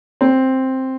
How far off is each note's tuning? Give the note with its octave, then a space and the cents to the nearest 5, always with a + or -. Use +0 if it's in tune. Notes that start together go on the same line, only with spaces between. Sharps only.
C4 +5